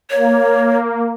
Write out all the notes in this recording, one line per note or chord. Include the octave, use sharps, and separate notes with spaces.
A#3 C#5